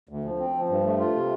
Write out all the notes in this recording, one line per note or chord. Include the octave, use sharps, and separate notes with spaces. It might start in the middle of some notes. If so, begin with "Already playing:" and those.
D2
F3
C4
F3
G2
A3
F4
C3